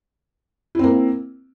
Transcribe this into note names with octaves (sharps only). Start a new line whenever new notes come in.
A#3 C4 E4